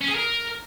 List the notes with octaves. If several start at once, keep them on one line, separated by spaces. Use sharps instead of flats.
C#4
G#4
A#4